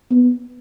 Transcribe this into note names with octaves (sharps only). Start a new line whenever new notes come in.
B3